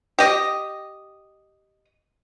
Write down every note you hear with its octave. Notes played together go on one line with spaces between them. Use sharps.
G4 D#5